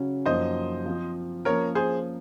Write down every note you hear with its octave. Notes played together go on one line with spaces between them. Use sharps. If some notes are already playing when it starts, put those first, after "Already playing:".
Already playing: C#3 F#3 C#4
F#2 F3 A#3 D#4 C5 D#5
F3 C4 F4
F3 A#3 C#4 A#4 C#5
G#4 C5